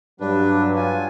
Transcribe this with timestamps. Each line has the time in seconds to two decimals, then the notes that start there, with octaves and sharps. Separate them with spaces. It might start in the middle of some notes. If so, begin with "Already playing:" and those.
0.20 G2 F#3 D4 B4
0.76 F4 G#5